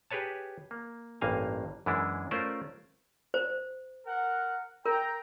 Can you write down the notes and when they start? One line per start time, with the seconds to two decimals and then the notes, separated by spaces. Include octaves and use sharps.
0.11 G4 G#4 B4 C#5 A5
0.71 A#3
1.21 A1 G2 A#3 F5 G#5 A#5
1.86 F#2 E3 G#3 D4 E4
2.31 A3 C#4 F4 A#4 C5 D5
3.34 C5
4.07 A#4 F#5
4.86 A#4 G5 A#5